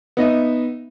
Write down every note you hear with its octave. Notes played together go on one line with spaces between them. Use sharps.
B3 D#4 D#5 E5